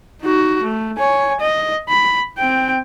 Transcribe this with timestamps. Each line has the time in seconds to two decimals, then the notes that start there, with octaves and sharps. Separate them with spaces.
0.21 D#4 F#4
0.63 A3
0.98 C#5 G#5
1.40 D#5
1.89 B5
2.38 C4 G5